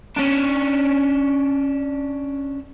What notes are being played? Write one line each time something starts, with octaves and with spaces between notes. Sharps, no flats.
C#4 D4